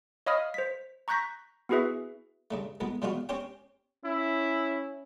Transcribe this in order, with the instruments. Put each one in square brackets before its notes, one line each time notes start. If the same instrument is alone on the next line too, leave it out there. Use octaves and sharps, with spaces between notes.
[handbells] C#5 D#5 F5 B5 D#6 F6
C5 B6
A#5 C#6 F#6 G6 A#6 B6
B3 E4 F#4 G#4 B4 E5
[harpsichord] G2 C#3 A3
C2 F2 G#2 B3
C3 G3 G#3 B3 F4 F#4
C4 C#4 G4 C5 C#5 G5
[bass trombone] C#4 [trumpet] E4